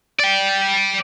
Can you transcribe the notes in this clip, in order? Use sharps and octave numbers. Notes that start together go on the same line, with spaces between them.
D5 G5